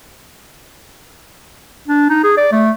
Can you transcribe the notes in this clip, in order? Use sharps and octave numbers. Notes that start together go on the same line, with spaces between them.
D4
D#4
G#4
D5
A3